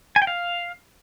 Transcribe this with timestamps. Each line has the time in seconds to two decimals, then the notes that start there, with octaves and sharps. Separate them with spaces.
0.16 G#5
0.22 G5
0.27 F5